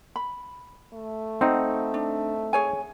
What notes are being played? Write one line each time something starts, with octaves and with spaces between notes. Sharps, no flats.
B5
A3
C4 D#4 F#5
D4
G#4 C#5 G#5